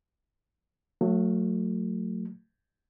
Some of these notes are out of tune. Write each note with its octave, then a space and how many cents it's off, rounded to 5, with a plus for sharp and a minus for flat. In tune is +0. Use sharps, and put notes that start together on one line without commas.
F#3 -25 A3 +20